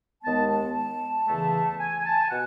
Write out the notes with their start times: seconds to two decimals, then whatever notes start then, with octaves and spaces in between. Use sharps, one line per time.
0.23 D#2 D#3 G#3 B3 A5
0.50 A5
0.75 A5
1.27 E2 C#3 E3 A3
1.79 G#5
2.05 A5
2.22 G#5
2.30 B2 F#5